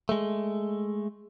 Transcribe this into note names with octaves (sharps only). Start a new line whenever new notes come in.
G#3 A3